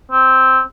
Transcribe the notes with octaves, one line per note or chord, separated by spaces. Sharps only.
C4